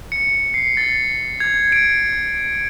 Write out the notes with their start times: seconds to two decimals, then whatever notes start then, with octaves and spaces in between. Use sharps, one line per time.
0.12 C#7
0.54 C7
0.77 A6
1.40 G#6
1.72 D7